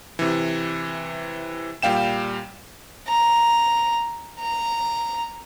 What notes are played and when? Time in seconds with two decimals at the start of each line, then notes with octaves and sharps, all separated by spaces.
0.19 C3 E3
1.82 A#2 G3 F5 G5 E7
3.08 A#5
4.40 A#5